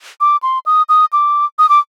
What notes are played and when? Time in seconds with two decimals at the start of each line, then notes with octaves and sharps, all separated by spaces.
0.21 D6
0.43 C6
0.66 D#6
0.89 D#6
1.13 D6
1.59 D#6
1.69 D6